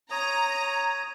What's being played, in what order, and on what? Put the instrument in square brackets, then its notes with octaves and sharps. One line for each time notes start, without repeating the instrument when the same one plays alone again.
[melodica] C#5 D#6 [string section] A#5